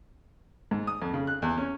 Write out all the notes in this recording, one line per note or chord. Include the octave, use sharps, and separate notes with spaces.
G#2
D#6
F2
C#3
F#6
E2
C#4